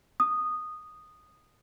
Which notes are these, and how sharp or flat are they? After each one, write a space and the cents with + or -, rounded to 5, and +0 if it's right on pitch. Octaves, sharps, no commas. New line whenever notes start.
D#6 -10